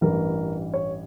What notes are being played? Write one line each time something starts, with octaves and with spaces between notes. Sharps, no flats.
A1 G2 E3 A#4
C#5